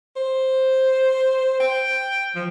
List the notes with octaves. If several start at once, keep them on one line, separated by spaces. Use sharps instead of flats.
C5
G5
F3